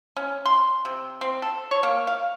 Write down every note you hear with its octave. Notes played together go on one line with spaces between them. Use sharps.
C#4
C6
C3
C4
A4
C#5
A#3
F5